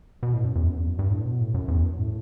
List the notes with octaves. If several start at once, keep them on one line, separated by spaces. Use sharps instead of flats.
B2
A2
F#2
E2
F#2
E2
F#2
G2
A2
B2
A2
F#2
E2
F#2
A2